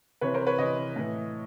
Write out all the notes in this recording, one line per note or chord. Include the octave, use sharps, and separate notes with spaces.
C3 E3 B4 C#5
A#4 C5
B4 C#5
C3 E3 C#5 D#5
A2 E3